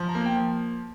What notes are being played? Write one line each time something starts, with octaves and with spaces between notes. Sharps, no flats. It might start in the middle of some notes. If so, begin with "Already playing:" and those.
Already playing: F3
A#5
A#3
G5
F3